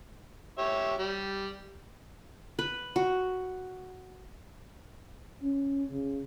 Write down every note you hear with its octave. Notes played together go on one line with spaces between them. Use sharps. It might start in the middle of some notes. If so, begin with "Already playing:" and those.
G4 C#5 E5
G3
B4
F#4
C#4
C#3